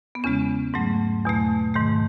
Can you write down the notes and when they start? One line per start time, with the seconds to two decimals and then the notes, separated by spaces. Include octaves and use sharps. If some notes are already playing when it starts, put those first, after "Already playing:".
0.15 B3
0.24 E2 C#3 G#3 C#4
0.74 G#2 F#3 A3
1.25 E2 B2 A3
1.74 G#2 D#3 A3